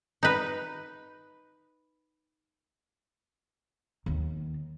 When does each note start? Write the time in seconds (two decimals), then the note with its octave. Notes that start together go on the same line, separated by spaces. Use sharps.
0.23 D#4 B4
4.06 D#2 D#3